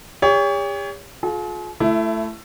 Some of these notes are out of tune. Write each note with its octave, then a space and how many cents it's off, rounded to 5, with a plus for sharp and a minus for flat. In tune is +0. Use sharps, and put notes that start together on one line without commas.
G4 +45 C#5 +30
F4 +30 G#4 +45
A3 +0 E4 +25